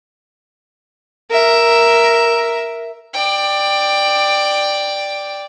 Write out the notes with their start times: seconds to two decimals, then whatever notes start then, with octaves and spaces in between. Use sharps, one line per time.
1.31 A#4 E5
3.14 D5 G5